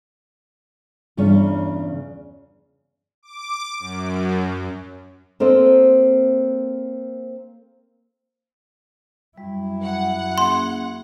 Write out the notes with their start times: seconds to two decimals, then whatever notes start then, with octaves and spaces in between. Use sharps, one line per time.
1.17 E2 G2 C#3 F4 C#5
3.23 D6
3.80 F#2
5.40 A#3 C4 A4 C5 D#5
9.38 F#2 G3 E4
9.83 F#5
10.38 A#3 C#4 G#4 C6